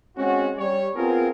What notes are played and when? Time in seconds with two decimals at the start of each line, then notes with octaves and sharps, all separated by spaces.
0.17 G#3 C4 C#4 F#4
0.57 G3 C#5
0.95 B3 C4 F4 G#4 A#4